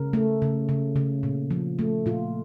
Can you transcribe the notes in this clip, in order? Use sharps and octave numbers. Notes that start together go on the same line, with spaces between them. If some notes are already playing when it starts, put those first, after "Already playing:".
Already playing: C#3 A#4
A3
C#3
C#3
C#3
A#2
F3
A3
A#2 F4